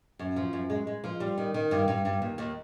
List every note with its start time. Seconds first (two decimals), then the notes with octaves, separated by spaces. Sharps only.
0.19 F#2
0.36 F3
0.53 F#2
0.70 G#3
0.87 G#3
1.04 F3
1.20 G3
1.38 D#3
1.54 D#3
1.71 G2
1.88 G2
2.05 G2
2.22 D#2
2.38 D#2